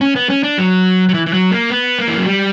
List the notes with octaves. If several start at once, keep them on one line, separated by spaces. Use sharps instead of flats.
C#4
B3
C#4
D4
F#3
F#3
E3
E3
F#3
A#3
B3
A#3
E3
F#3
G3